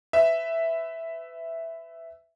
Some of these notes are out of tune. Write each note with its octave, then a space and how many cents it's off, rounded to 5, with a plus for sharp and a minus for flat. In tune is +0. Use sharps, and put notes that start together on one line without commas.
B4 +30 E5 +0